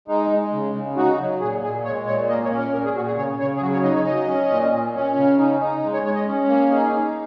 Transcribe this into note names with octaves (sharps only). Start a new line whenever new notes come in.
G#3 D#4
G#3
C#3
C#3
D#4 F#4
F#3
A#2 G#4
A#2 G#4
G#3 C#5
A#2 C#5
A#3 D#5
C#5
C#4
A#4
A#2 A#4
G#4
A#2 F#4
G#4
C#3 C#5
C#3 C#5
G#4
F#3 F#4
C#5
D#4 D#5
C#5
F#3 D#5
C#4
A#2
A#2
C#4
C#3
D#4
D#4
G#3
C#5
G#3 C#5
D#5
C#4
A#3
D#4 G#4
D#4